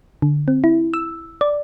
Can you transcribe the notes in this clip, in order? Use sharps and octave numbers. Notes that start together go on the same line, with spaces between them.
D3
C4
E4
E6
D5